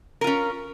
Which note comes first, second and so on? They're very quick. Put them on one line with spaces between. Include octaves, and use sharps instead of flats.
A#4 F4 C#4